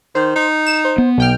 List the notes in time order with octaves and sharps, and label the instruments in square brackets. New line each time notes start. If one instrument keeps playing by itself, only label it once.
[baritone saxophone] D#3 [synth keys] C5
[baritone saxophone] D#4
[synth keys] E7
C5
[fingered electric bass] B3
[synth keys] B1 G5 F6